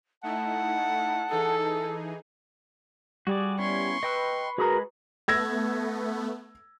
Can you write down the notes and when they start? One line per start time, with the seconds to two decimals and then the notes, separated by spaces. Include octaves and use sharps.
0.23 A3 D#4 E4 F#5 A5
1.30 E3 D#4 G#4 A4
3.27 G3 F#4 G#4 D5
3.58 B3 C#4 E4 C6 C#6
4.03 B4 D#5 G5 E6
4.58 G#3 F#4 G#4 A#4 B5
5.28 A3 B3 E6 G#6 A#6